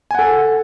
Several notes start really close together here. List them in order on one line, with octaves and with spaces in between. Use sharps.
G#5 F#5 A4